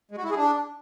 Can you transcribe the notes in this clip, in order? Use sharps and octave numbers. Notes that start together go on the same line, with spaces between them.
G#3
F#4
E4
G#4
D4